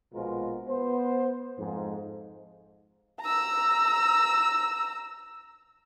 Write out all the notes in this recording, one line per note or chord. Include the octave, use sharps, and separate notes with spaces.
A#1 B2 G#3 F4 A#4 C5
B3 C5
F2 G#2 F3
A#5 E6